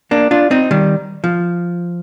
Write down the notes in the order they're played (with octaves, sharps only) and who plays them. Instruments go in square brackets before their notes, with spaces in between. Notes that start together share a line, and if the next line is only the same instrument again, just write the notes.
[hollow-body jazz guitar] A#3 D4
D4 F4
C4 D#4
D#3 G3
F3